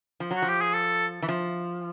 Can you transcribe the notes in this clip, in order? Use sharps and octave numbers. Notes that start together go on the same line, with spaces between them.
F3
F#3
F#4
F3
G4
G#4
A4
E3
F3